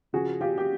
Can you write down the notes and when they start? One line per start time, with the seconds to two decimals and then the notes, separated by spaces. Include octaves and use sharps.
0.13 C#3 F3 F#4 G#4
0.41 F4 G4
0.58 G4